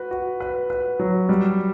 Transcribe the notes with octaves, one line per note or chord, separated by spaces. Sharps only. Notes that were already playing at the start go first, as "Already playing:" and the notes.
Already playing: F#4 B4
F#4
B4
B4
F#3
G3